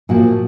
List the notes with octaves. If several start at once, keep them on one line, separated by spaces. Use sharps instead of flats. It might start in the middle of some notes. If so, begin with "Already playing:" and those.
A#2 F3 A#3 F#4